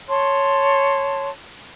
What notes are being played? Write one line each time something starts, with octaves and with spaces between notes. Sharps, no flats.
C#5 A5 C6